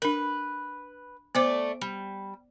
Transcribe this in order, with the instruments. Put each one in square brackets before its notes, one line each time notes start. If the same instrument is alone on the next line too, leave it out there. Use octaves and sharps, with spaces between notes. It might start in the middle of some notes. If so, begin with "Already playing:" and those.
[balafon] D4 A#4 [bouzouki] B4
[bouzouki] A3 D5 [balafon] B3 C5 D6
[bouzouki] G3